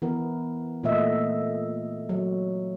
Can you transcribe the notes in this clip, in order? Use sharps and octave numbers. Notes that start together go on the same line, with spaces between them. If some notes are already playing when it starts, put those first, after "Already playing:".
E3 B3 A#4
A#2 E3 A3 A#3 D#5 E5
F#3